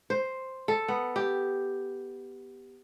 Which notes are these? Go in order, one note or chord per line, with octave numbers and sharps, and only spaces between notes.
C5
A4
B3
G4